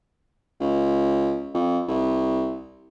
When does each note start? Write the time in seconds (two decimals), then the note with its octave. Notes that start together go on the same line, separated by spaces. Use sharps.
0.60 C#2
1.54 F2
1.88 C2